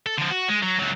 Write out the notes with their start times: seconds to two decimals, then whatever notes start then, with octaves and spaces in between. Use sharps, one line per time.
0.06 A4
0.18 D3 F3
0.31 F#4
0.48 G#3
0.62 F#3
0.79 C#2 F#3